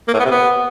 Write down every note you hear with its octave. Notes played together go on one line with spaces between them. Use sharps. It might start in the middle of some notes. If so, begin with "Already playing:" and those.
A#3
A2
B3
C3
B3